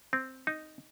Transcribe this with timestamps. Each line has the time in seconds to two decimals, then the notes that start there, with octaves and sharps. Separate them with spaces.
0.13 C4
0.47 D#4